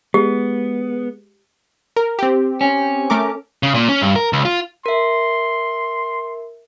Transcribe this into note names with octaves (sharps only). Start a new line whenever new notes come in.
G#3 B3 G4
A#4
C4 G4
C#4
A3 A#4 D6
C#3
A#2
C#4
G2
A#4
C#2
F4
A#4 E5 C6